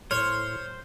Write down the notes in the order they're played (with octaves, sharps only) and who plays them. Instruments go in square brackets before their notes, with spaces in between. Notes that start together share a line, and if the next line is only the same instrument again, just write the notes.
[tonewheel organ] A2 [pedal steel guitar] C5 [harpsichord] C#5 [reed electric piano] F6